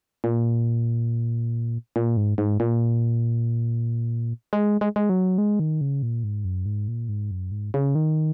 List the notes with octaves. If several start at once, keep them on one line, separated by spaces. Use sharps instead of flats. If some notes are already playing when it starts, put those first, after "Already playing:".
A#2
A#2
G#2
G#2
A#2
G#3
G#3
G#3
F#3
G#3
D#3
C#3
A#2
G#2
F#2
G#2
A#2
G#2
F#2
G#2
C#3
D#3